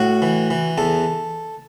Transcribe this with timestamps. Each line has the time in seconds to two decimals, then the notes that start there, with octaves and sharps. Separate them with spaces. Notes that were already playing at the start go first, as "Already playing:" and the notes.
Already playing: A2 F#4
0.22 E3
0.50 E3
0.78 E2 A4